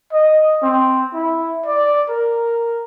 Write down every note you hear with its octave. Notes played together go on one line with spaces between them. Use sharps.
D#5
C4
E4
D5
A#4